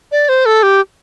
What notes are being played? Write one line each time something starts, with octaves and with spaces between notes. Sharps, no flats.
D5
C5
A4
G4